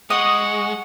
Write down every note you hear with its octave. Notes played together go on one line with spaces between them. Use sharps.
G#3 F#5 C#6 D#6